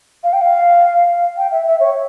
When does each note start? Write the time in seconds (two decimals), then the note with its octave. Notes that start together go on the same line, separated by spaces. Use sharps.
0.24 F5
0.33 G5
0.41 F5
1.37 G5
1.51 E5
1.66 E5
1.80 C#5